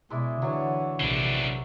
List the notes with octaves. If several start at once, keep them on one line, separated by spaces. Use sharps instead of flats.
B2 G#3 E4 D5
D3 E3 F#3 C#5
A#1 C3 E3 D4